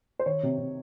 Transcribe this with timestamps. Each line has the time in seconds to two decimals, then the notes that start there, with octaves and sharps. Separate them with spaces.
0.19 C5
0.26 D#3 C#5
0.43 C3
0.58 C3